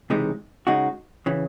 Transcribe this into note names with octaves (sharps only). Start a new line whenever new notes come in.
C#2 C3 E3 G#3 D#4
C#3 G#3 D#4 F#4
C#3 E3